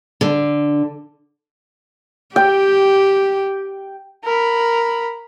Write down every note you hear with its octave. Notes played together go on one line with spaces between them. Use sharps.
D3
G4 G5
A#4 B5